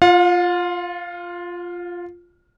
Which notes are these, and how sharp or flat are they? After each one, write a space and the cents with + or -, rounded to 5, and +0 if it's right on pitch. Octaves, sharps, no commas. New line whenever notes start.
F4 +0 F5 +40